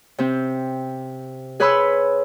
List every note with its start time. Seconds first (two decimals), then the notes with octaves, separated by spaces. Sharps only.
0.18 C3 C4
1.60 G#4 B4 C#5 B5 C6 E6